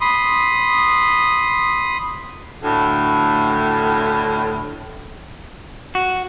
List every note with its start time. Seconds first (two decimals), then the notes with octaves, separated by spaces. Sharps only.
0.01 B5 C6 D#6
2.64 D2 A2
5.95 F#4